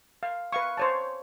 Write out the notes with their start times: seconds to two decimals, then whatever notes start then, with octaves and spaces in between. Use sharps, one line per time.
0.23 F5
0.52 B4 F5 C#6
0.77 C5 C#5 A5